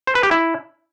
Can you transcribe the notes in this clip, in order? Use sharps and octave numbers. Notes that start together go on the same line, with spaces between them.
C5
B4
G4
E4